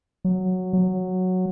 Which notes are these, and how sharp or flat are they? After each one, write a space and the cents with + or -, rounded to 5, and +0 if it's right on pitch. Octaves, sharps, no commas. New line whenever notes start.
F#3 -5
F#3 -5